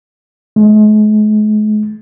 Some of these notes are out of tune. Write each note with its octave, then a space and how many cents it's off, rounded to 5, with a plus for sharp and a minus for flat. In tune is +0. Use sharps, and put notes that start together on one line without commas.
G#3 +40